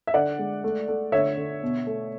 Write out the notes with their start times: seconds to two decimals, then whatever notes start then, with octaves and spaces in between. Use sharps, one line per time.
0.07 E5
0.14 D3 D5 F#5
0.39 G#3
0.64 A3
0.88 A3
1.12 D3 C#5 E5
1.37 D3
1.63 B2
1.87 A3